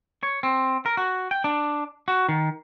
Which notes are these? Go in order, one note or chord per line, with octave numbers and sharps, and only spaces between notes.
C#5
C4
A#4
F#4
G5
D4
F#4
D#3